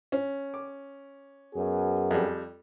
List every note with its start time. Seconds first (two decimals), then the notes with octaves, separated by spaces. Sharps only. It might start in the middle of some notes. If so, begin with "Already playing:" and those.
0.12 C#4
0.54 D6
1.54 F#2 B3 F#4 G#4
2.11 F2 G3